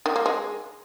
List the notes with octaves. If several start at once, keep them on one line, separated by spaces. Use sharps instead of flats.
D#3
A#3
G#3